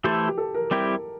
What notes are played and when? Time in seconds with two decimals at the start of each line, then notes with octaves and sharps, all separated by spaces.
0.04 E3 A3 E4 G4 A4 C5
0.28 G4
0.38 A4
0.54 A#4
0.71 G3 C4 E4 G4